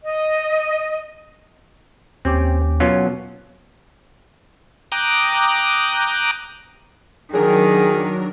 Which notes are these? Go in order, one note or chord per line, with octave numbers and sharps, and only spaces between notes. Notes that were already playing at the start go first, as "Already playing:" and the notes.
D#5
D#2 C4 C#4 G4 D6
B2 F#3 C#4 F4
G5 A#5 D6 D#6 F#6
D#3 F#3 D4 G#4 A#4